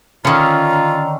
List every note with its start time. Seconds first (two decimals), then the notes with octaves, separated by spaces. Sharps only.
0.25 D3 D#3 C#4 F4 A#5